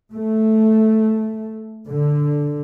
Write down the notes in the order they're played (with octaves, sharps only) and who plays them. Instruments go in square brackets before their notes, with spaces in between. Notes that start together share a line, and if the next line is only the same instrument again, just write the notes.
[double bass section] A3
D3